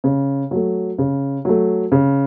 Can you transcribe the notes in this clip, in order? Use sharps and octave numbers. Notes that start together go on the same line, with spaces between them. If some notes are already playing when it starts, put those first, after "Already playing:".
C#3
F#3 A3
C#3
F#3 A3
C#3